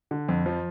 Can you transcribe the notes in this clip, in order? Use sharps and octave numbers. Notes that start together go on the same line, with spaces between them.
D3
F2
F3